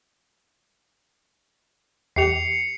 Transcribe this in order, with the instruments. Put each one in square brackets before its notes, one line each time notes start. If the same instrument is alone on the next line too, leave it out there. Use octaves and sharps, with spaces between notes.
[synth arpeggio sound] E2 G4 [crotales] C7 C#7 F7